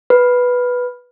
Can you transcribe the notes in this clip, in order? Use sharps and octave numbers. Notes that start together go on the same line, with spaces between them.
B4